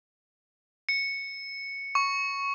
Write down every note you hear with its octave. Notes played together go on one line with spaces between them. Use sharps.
C#7
C#6